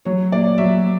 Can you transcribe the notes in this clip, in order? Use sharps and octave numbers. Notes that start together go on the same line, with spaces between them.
F#3 C#5
A#2 D5
F#3 E5